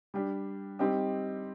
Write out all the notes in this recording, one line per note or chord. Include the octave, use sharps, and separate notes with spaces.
G3 D4 G4
G3 C4 D#4 G4